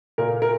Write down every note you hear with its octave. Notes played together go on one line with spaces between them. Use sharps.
A#2 A#4
A#4